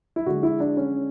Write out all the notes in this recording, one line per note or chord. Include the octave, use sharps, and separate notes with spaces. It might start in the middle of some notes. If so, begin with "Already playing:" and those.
E4
D3 G#3 F#4
E4
D4
C#4